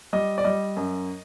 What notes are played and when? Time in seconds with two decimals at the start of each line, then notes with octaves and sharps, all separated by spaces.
0.13 G3 D#5
0.38 D5
0.44 G3 D#5
0.76 F#2